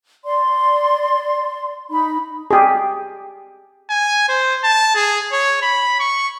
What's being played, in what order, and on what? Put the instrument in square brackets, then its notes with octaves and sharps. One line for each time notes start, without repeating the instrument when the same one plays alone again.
[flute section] D5 C6
D#4 B5
[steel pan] G4 G#4
[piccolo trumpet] G#5
C5
A5
G#4
C#5
B5
C#6